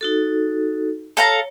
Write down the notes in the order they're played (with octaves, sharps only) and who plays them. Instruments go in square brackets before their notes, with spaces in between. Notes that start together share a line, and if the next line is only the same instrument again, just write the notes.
[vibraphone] D#4 F#4 A4
[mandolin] A4 F5 A#5 [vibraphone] C#5